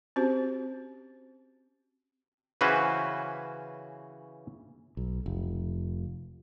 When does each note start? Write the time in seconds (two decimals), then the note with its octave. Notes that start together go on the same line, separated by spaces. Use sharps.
0.16 C4 C#4 F#4 G4 C5
2.61 C#3 E3 C#4 F#4 B4 C5
4.97 B1
5.26 F1